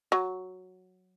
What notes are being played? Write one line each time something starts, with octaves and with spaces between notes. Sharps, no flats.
F#3